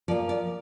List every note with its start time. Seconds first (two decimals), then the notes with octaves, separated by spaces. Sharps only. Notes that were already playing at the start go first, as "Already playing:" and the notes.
0.08 F3 D5
0.11 A#3
0.29 D5